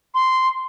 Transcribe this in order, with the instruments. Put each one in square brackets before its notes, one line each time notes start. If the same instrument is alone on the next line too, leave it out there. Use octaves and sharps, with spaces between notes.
[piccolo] C6